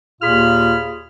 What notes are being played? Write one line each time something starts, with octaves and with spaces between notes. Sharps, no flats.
D#2 A#2 F4 G#4 B5 F6